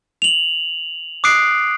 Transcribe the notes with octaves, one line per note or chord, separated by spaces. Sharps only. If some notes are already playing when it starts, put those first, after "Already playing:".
F7 F#7
D6 D#6 F#6 C7 D7